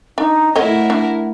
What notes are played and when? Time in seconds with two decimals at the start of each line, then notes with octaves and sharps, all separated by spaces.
0.18 D4 D#4
0.56 A3 E4 A4 A#4 C#5 D#5 F#5
0.90 D4